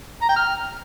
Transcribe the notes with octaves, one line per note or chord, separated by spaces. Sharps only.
A#5
G5
F6